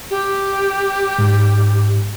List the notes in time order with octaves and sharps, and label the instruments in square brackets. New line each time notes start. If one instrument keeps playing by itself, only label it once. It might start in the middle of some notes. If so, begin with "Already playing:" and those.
[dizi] G4
[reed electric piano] G#2